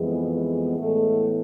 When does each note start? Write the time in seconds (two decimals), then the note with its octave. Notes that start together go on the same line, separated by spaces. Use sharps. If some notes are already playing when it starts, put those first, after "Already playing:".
Already playing: F2 E3 G#3 B3 G#4
0.31 G#3 G#4
0.78 A2 E3 G#3 A3 B3 A4